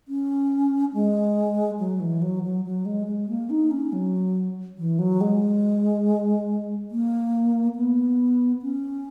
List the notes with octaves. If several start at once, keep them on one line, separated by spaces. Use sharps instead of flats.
C#4
G#3
F#3
E3
F#3
F#3
F#3
G#3
G#3
A#3
D#4
C#4
F#3
E3
F#3
G#3
A#3
B3
C#4